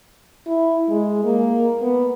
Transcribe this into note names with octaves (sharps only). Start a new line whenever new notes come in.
E4
G#3
A#3
B3